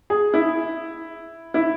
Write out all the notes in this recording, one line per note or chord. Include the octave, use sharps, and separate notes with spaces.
G#4
E4
E4